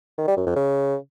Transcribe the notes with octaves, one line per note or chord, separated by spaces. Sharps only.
D#3
G3
F#2
F2
C#3